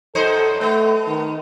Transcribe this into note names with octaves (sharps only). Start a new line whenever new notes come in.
F#2 D#4 A4 C5
A3 B3
D#3